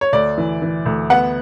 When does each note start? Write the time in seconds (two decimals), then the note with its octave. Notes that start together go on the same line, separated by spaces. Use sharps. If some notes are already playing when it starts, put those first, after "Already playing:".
0.01 C#5
0.13 D2 D5
0.38 E3
0.62 E3
0.86 D2
1.10 B3 F#5